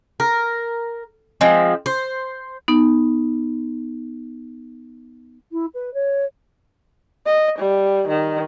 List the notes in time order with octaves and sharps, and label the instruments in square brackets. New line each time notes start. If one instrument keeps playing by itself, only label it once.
[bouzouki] A#4
F3 G#3 C4
C5
[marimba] B3 D#4
[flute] E4
B4
C#5
[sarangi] D#5
G3
D#3